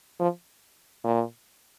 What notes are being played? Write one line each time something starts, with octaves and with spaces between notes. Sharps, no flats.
F3
A#2